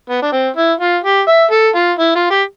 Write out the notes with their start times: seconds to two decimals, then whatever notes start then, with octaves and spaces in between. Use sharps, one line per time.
0.09 B3
0.22 D4
0.32 C4
0.56 E4
0.80 F4
1.04 G4
1.28 E5
1.51 A4
1.75 F4
1.99 E4
2.15 F4
2.31 G4